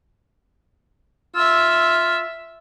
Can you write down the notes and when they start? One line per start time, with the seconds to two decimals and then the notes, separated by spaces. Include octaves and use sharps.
1.35 F4 E5 E6